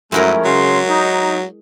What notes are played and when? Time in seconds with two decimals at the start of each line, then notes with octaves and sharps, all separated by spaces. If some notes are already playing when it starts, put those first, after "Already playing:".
0.12 F#2 F3 G#3 A3 C#4 E4 A#4
0.45 C#3 F#3 C6
0.89 D#4